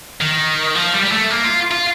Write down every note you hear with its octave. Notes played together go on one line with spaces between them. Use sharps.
D#3
F3
G3
G3
A3
A#3
F4
F4